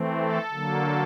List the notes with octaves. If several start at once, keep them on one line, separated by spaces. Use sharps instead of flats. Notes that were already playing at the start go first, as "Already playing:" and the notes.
Already playing: E3 A3 C4
A4
D3 F#3 A#3